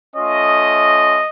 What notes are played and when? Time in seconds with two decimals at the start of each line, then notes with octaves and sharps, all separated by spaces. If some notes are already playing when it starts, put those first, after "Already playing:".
0.16 A3 C#4 F4 D#5